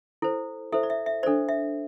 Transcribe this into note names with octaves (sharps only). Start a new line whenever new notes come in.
E4 A4 C5
E4 A4 C5 E5
D5
E5
E5
D4 A4 C5 D5
E5